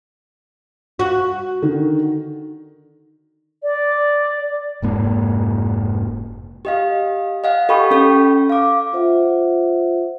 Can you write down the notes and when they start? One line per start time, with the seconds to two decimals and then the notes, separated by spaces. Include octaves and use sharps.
0.99 F#4
1.62 D3 D#3
3.64 D5
4.82 F1 G#2 A#3
6.65 G4 D#5 F5
7.44 D#5 F5 F#5
7.69 G4 A4 G5 B5 C#6
7.91 C#4 A4
8.50 F5 D6
8.93 F4 C5 E5 F#5